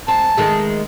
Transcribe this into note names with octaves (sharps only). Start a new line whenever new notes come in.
C4 A5
D#3 G#3 A3